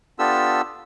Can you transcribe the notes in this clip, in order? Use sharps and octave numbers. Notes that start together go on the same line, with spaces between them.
B3 D4 F4 G4 A4 E6